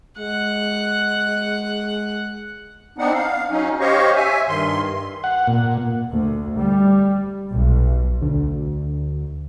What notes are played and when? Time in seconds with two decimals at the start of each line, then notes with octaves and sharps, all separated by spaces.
0.19 G#3 F#5
2.98 B3 C4 D4 D#4 F#5
3.14 F5
3.51 F#3 C#4 D#4
3.80 G4 C5 C#5 D#5 F5 C#6
4.16 E5 G#5
4.48 G2 D#3 C6
5.24 F#5
5.47 A#2
6.11 D2
6.58 G3
7.51 B1
8.22 D2